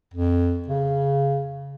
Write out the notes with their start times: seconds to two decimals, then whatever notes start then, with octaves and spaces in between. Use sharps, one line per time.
0.14 F2
0.68 C#3